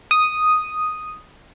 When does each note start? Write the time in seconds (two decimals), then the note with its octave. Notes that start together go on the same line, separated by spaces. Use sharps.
0.11 D#6